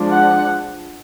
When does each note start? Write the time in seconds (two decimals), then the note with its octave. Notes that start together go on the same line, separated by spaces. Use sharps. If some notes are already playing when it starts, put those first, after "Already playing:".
Already playing: F3 G#3 D4
0.12 F#5